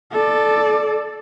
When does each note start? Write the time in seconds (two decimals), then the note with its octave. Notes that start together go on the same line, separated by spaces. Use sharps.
0.12 A4 D5